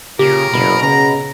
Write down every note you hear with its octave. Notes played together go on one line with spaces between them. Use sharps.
A#2 C#3 G4 A#4
F#1 B2 B5
C#3 A#5